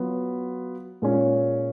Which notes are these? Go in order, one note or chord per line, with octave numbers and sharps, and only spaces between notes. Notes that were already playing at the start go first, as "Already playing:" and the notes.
Already playing: F#3 B3 F4
A#2 G#3 C#4